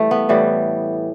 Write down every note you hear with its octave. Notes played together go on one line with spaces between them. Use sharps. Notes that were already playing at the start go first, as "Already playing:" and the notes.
Already playing: E3 G3 A3
B3
A2 E3 G3